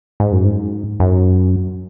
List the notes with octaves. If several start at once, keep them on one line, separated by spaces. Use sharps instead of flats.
G#2
F#2
G#2
F#2